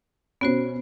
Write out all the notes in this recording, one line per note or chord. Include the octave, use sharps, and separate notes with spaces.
B2 B3 C#4 F#4 C5